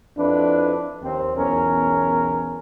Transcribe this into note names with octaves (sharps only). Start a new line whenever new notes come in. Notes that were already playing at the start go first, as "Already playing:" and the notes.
F2 D4 E4 B4
D#2 C4
B1 E2 C#4 A#4